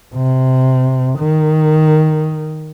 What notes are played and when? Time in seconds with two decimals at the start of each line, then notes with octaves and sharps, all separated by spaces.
0.15 C3
1.19 D#3